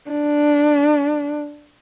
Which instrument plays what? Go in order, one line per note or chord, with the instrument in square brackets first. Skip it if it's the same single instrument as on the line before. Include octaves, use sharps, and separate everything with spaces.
[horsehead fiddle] D4